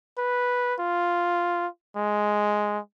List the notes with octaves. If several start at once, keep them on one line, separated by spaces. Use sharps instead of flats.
B4
F4
G#3